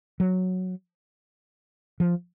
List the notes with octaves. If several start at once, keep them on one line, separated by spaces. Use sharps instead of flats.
F#3
F3